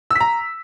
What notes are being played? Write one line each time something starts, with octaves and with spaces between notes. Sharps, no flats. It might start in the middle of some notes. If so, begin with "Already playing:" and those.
A#5 E6 B6